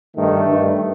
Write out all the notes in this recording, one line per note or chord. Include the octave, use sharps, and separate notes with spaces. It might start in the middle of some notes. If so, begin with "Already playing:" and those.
G2 D#3 A3
G2 D#3